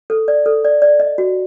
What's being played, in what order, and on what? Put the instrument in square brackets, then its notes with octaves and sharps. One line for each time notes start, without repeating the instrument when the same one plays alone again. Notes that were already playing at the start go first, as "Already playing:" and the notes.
[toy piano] A4
D5
A4
D5
D5
D#5
F#4